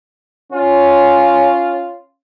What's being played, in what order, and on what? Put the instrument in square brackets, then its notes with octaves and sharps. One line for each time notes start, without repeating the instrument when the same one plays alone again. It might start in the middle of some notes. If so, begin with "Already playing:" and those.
[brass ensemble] C#4 F4